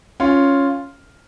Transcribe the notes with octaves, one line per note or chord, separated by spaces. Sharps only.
C#4 F4